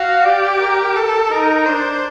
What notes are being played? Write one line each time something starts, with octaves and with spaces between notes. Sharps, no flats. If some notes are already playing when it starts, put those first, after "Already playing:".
Already playing: F#4 F5
G4 D5
A#4
A4
D#4 A#4
D4 C5